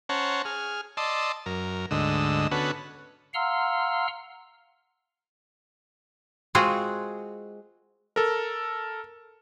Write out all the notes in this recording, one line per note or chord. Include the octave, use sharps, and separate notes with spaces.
C#4 C5 C#5 F#5 A5 A#5
G#4 F6
D5 D#5 A5 C6 E6
F#2 A#4
D2 G#2 D3 D#5 E6
D3 B3 C#4 F#4 A4 B4
F5 F#5 A#5 C6 E6 F6
G#3 C4 F4 F#4 G#4
A4 A#4